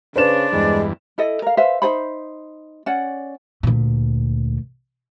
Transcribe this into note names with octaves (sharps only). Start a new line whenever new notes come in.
C#3 D4 B4 C5 E7
E2 G2 G#3
E4 A4 D#5
A#4 F5
B4 C5 E5 F5
D#4 G#4 C5 B5
C#4 D5 F#5
D2 A#2